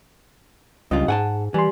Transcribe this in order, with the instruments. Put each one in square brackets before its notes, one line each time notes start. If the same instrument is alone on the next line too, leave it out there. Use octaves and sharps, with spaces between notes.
[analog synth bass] C#2 [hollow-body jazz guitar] G2 C#3 F4 [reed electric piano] D#5
[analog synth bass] G#2 [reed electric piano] G#4 [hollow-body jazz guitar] F#5 G#5 A5
[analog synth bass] E3 [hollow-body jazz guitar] G3 [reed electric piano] G#5 C6